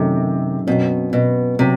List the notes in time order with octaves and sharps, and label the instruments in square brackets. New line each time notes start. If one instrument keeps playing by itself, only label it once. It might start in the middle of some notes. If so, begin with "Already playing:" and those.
Already playing: [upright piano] F#2 D#3 F#3 A3 D#4 [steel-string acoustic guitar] C3
[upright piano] F#2 F#3 C4 [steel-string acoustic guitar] B2
[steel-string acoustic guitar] B2
[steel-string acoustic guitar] C3 [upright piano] F#3 C4